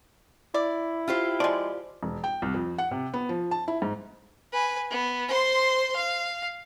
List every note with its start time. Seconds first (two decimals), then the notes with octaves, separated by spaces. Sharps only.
0.54 E4 D5
1.08 F4 G4 C5
1.40 F3 G#3 D5
2.03 E1
2.24 G5
2.42 C2
2.54 F2
2.78 F#5
2.91 C3
3.14 B3
3.29 F3
3.51 A5
3.68 E4
3.82 G#2
4.53 B4 G#5
4.90 B3
5.28 C5 C6
5.96 F5